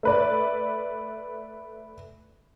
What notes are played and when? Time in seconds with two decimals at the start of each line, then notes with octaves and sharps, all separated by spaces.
0.03 A3 B4 D5